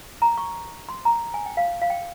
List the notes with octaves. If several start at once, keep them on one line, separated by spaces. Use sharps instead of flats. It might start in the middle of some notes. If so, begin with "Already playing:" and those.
A#5
C#6
C6
A#5
G#5
G5
F5
F5
G5